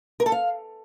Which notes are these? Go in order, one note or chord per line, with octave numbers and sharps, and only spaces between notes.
A#4
A4
F5